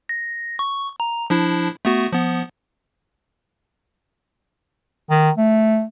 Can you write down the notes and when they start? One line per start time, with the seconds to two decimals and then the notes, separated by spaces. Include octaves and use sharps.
0.09 A#6
0.59 C#6
1.00 A#5
1.30 F3 D4 E4
1.85 A3 B3 F#4
2.13 F3 B3
5.10 D#3
5.37 A3